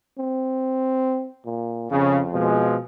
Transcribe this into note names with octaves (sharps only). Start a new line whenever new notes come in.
C4
A#2
F2 C#3
B2 F3 G#3